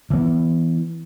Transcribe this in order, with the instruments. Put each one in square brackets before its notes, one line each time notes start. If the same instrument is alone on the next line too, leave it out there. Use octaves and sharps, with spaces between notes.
[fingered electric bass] E3 B3